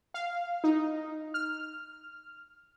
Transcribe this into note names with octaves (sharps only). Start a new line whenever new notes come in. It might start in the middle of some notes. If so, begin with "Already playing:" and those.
F5
D#4
F6